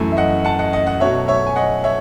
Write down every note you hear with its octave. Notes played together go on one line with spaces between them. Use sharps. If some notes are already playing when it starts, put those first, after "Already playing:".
Already playing: F#2 E3 A3
E5
D#5 F#5
F#5 A5
D#5 F#5
D#5 F#5
D#5 F#5
B2 F#3 A3 C#5 E5
C#5 E5
G#5
D#5 F#5
C#5 E5